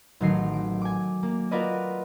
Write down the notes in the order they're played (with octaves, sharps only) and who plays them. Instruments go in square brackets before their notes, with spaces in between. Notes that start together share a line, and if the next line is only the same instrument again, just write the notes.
[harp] A1 D#3 F#3 D#4 A#4 C7
D7
G#5 D6
A#3
F4 F#4 A#4 B4 D5 D#5